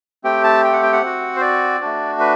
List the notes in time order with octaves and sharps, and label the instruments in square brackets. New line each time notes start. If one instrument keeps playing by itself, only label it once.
[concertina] A3 C4 G4 G5
A5
G5
F#5
G5
F#5
C4 F#4
C5
D5
A3 D4 F#4
B4